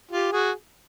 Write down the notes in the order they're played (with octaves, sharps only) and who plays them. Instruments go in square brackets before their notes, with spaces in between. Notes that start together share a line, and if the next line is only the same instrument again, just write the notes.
[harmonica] F4 G4
F#4 G#4